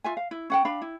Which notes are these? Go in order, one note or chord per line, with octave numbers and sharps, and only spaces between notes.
F4 E5 G#5
F5
E4
C#4 F#5 G5
D4 F5 B5
E4